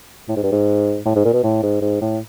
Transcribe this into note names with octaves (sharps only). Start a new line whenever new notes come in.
A2
G#2
G2
G#2
A2
G#2
A#2
B2
A2
G#2
G#2
A2